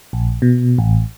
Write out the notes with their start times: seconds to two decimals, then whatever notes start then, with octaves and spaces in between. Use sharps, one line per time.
0.13 A#1
0.42 B2
0.78 A1